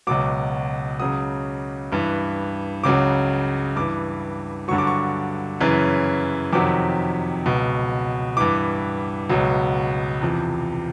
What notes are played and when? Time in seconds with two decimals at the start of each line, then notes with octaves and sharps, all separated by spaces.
0.07 C#2 B2 F#3 D6
1.00 C#2 C#3 F#3 D#6
1.92 G2 E3
2.84 C#2 C#3 F#3 D6
3.76 G2 E3 D6
4.68 G2 D3 F#3 C#6
4.78 D6
4.87 C#6
5.60 F#2 C#3 E3
6.53 F2 C3 D#3 F#3 D6
7.46 C#2 B2 F#3
8.37 G2 E3 D6
9.30 C#2 B2 F#3
10.21 E2 C3 F3